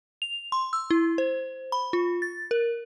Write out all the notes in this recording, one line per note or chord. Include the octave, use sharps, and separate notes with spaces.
F7
C6
E6
E4
C5
B5
F4
A6
A#4